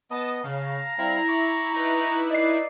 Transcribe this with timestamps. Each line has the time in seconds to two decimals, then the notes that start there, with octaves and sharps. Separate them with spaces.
0.11 B3 D#5 A5 D#6
0.44 C#3 F5 A5 A#5
0.98 G3 C4 E4 F5
1.28 B5 C#6 D6
1.73 D#4 E4 B4 A#5
2.31 D5 D#5 C7